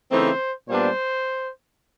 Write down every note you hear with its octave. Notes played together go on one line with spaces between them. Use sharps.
C#3 E3 A3 C4 D#4 C5
A#2 G3 B3 D4 C5